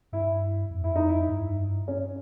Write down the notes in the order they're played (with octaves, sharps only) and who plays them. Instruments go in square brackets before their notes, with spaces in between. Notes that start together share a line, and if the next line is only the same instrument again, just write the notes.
[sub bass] G2 [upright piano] E4
[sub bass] F2
[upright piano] E4
D#4
E4
[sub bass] G2
[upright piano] C#4